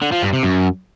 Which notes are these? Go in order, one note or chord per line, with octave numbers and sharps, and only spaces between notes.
D3
F3
G2
C3
F#2